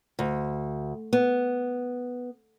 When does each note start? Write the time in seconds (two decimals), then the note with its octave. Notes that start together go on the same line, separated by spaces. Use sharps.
0.19 D2
1.13 B3